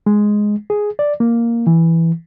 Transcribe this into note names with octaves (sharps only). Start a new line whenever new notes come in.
G#3
G#4
D5
A#3
E3